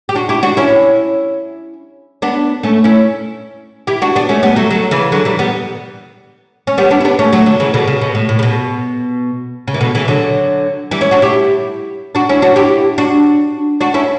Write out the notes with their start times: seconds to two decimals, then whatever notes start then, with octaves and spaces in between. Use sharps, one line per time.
0.09 G4
0.15 D4 F#4
0.29 E4 G4
0.43 D4 F#4
0.57 C#4 E4
2.22 B3 D4
2.63 A3 C#4
2.84 C#4 E4
3.87 E4 G4
4.02 D4 F#4
4.15 B3 D4
4.29 A3 C#4
4.43 G3 B3
4.56 F#3 A3
4.71 D3 F#3
4.91 C#3 E3
5.12 D3 F#3
5.25 E3 G3
5.39 G3 B3
6.67 C#4
6.78 G3 B3
6.91 B3 D4
7.00 E4
7.05 B3 D4
7.19 A3 C#4
7.33 F#3 A3
7.46 D3 F#3
7.60 C#3 E3
7.74 B2 D3
7.87 C#3
8.01 B2
8.15 A2
8.29 A2
8.39 C#3
8.43 B2
9.68 C#3
9.74 E3
9.81 B2 D3
9.95 C#3 E3
10.08 D3 F#3
10.91 E3 G3
11.01 C#4 E4
11.11 D4 F#4
11.22 E4 G4
12.15 D4 F#4
12.29 C#4 E4
12.42 D4 F#4
12.56 E4 G4
12.98 D4 F#4
13.81 D4 F#4
13.94 C#4 E4